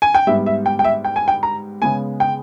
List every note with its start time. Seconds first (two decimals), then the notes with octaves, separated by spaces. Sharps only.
0.02 G#5
0.14 G5
0.27 G#2 G3 B3 E5
0.46 E5
0.66 G5
0.79 G5
0.84 E5
1.05 G5
1.16 G#5
1.28 G5
1.43 A#5
1.82 C#3 G#3 B3 G#5
2.20 G5